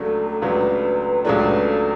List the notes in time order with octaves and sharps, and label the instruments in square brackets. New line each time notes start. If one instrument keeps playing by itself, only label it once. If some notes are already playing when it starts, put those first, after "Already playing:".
Already playing: [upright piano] C#2 C#3 F#3 A3 D4 [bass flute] A4
[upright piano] C#2 C#3 F#3 A3 D4 [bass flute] B4
[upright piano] C#2 C#3 F#3 A3 D4 [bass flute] C#5
[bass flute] B4
A4